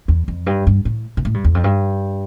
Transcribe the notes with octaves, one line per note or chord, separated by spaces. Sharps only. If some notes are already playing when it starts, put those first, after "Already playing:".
E2
F2
G2
G2
A2
A#2
A2
G2
E2
F2
G2